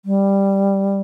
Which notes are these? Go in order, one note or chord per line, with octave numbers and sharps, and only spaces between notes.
G3